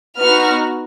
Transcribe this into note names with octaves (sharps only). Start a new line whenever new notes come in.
B3 D#4 F#4 F6